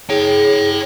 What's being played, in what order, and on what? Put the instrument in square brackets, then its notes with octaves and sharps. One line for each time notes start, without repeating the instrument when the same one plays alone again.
[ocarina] G#4 [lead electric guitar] C#5 G5